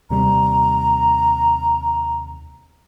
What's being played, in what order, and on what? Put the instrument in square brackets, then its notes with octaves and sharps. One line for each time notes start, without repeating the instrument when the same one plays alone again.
[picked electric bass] D#2 C3 G3 [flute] A#5